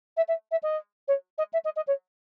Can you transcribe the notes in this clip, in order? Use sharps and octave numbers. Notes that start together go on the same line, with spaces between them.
E5
E5
E5
D#5
C#5
D#5
E5
D#5
D#5
C#5